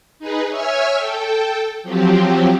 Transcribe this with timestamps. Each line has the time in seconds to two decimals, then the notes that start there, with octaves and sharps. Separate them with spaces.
0.19 D#4 G#4 B4
0.49 C#5 E5 G#5 E6 F6
0.97 A4 G5
1.83 F3 F#3 C4 G4